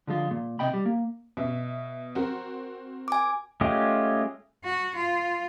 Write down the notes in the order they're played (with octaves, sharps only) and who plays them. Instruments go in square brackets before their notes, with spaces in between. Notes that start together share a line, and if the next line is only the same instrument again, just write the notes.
[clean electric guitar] D3 F3 G#3 F4
A#2
B1 C3 D#5 G5 B5
G3
A#3
[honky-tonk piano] B2 E5
C4 F#4 A#4
[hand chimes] G#5 D6
[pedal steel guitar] G#3 A3 C#4 F4 G4
[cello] F#4
F4